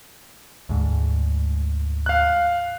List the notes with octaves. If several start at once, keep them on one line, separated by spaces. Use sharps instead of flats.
D2 G#2
F5 F#6